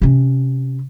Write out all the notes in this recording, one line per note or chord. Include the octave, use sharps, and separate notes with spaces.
C3 C#4